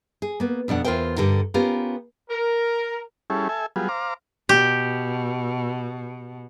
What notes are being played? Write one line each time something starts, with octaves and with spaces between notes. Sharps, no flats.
G#4
A#3 B3
F2 B2 D4 F#5
E2 F4 G#4 A#4 C5 G5
G2 D3 G4 A4 A#4
B3 C#4 F4 G4 A#4
A#4
G3 C#4 E4 G#4 A4
A4 E5 G#5
F#3 G3 B3 F4 G#4
C5 F5 A#5 D6
B2 G4